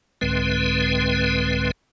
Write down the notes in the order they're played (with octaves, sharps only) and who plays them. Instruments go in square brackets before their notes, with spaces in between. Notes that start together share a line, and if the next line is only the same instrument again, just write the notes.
[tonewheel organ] C2 G#2 D3 G#3 C4 B4